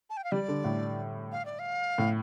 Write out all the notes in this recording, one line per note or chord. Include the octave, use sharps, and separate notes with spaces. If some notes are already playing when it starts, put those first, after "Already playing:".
A5
G5
F5
G3 D5
D3
A2
F5
D5
F5
A2